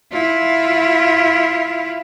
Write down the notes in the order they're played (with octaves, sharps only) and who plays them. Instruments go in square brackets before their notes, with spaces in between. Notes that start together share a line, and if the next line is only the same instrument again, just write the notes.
[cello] E4 F4